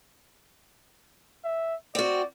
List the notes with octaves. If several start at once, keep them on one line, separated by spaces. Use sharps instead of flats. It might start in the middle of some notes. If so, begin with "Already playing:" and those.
E5
C4 F#4 D5